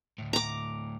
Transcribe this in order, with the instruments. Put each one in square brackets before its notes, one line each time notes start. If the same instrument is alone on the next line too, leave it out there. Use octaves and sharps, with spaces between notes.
[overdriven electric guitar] D2 A2
[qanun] A#5 D6